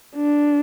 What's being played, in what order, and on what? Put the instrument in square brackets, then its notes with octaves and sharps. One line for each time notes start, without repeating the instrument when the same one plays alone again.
[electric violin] D4